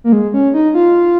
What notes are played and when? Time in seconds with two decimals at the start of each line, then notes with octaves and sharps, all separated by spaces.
0.04 A#3
0.13 G#3
0.34 C#4
0.54 D#4
0.75 F4